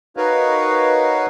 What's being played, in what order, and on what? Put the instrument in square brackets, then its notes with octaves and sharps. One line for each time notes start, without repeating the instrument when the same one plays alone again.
[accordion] D#4 F#4 A#4 B4 C#5 F5